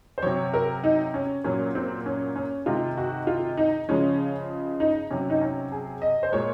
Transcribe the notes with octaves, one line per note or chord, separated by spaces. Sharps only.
C5
C3 F#3 C#5
A#4
D#4
C#4
A#2 F#3 C#4
C4
C#4
C#4
C3 D#3 G#3 F4
F#4
F4
D#4
C#3 F3 G#3 C#4
D#4
C3 F#3 C#4
D#4
C#4
G#4
D#5
C5
A#2 G#3 C#5